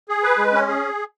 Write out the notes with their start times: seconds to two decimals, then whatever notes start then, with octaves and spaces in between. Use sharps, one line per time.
0.09 G#4
0.23 B4
0.38 G#3
0.53 C#4
0.68 G#4